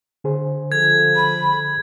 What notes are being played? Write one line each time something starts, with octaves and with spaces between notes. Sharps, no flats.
D3 G#4 C5
F3 A4 G#6
B5